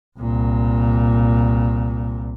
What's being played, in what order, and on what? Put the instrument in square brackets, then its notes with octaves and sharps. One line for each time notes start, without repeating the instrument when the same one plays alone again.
[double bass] C2 A#2